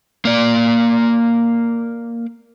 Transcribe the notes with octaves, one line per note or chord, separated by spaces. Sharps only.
A#3 D5